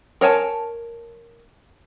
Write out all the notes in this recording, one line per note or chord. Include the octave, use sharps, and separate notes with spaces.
A#4 C#5 G#5 A5